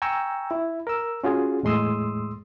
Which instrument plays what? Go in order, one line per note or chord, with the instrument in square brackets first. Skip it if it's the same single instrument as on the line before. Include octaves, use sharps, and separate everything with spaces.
[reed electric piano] G5 G#5 A#5 C#6 E6
E4
A#4 E6
C#4 F4 F#4 G#4
E2 A2 G#3 C6 D#6 E6